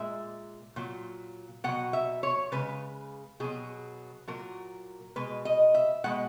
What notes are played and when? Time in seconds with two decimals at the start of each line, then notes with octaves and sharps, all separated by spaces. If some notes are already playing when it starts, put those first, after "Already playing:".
Already playing: A#2 G#3 E5
0.76 A#2 F#3
1.64 B2 F#3 F#5
1.93 E5
2.23 C#5
2.52 C#3 G#3 B4
3.40 B2 F#3 G#4
4.28 A#2 F#3 A#4
5.16 B2 G#3 B4
5.45 D#5
5.74 E5
6.04 B2 G#3 F#5